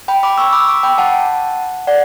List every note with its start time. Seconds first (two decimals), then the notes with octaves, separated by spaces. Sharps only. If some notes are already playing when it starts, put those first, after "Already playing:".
0.08 G5 B5
0.23 B5 D6
0.38 C#6 E6
0.53 B5 D6
0.62 E6
0.67 B5 D6
0.83 G5 B5
0.98 F#5 A5
1.87 D5 F#5